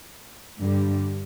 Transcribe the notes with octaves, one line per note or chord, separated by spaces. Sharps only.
G2 D3 G3